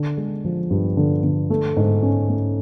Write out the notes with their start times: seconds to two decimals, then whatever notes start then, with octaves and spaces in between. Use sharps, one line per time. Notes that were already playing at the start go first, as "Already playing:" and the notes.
Already playing: D3
0.17 G#3
0.45 F3
0.70 G2
0.97 D3
1.24 D3
1.50 A3
1.77 G#2
2.03 C#4
2.29 A3